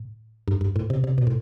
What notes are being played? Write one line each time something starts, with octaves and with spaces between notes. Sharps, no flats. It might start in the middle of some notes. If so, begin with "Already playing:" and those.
Already playing: A2
G2
G2
A2
C3
C3
B2
A2